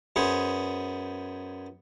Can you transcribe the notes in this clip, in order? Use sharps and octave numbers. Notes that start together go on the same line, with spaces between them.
F#2 B3 G#4 C5